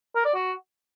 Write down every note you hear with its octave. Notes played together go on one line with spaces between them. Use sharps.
A#4
D5
F#4